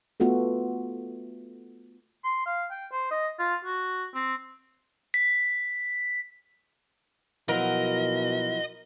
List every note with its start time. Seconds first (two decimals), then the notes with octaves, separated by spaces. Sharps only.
0.20 A3 B3 F4 F#4 A4
2.24 C6
2.46 F5
2.71 G5
2.92 C5
3.11 D#5
3.39 F4
3.65 F#4
4.15 C4
5.14 B6
7.49 B2 F3 F#3 E4 A#4 D#5